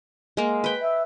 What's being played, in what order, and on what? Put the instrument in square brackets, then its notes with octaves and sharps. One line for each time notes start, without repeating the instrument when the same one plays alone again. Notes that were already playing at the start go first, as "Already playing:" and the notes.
[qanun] G#3 A#3
B4 G5
[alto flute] E5